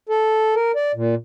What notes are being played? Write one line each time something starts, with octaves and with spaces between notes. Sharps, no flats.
A4
A#4
D5
A#2